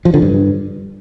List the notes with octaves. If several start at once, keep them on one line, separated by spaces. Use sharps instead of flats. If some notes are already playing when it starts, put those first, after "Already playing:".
F3
D3
G2